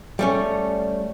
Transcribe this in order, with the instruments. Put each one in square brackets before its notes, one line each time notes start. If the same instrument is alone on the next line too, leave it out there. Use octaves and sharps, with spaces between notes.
[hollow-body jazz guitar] G3 A3 C#4